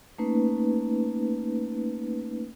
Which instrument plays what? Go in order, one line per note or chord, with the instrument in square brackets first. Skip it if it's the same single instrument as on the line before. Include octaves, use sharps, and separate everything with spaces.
[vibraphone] A3 A#3 C#4 D#4 B4